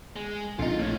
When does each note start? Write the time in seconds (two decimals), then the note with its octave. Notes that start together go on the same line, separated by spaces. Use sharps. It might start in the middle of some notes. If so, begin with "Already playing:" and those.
0.16 G#3
0.59 A#1 D3 C4 D#4 F4
0.79 A2 D4 C#5